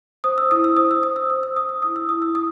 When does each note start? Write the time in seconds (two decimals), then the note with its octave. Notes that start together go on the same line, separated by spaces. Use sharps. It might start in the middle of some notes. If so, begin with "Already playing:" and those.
0.24 C5 D#6
0.38 E6
0.51 E4 D#6
0.64 E6
0.77 C5 D#6
0.91 E6
1.03 C5 D#6
1.16 E6
1.30 C5 D#6
1.43 E6
1.56 C5 D#6
1.69 E6
1.82 E4 D#6
1.96 E6
2.09 E4 D#6
2.22 E6
2.35 D#6